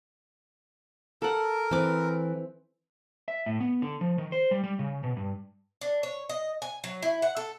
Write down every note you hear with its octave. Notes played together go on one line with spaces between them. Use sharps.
A4 A#4 F#5
E3 C4 D6
E5
A2
B3
D3
F3
D#3
C5
G3
G3
C#3
B2
G2
D4
C#5
D#5
G#5
F#3
E4
F#5
A4